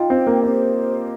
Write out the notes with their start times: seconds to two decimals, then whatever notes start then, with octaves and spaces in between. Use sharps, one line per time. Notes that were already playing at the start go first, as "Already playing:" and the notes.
Already playing: D#4 F4 G5
0.10 C4 G4
0.27 A#3
0.43 C4 C5
0.77 G4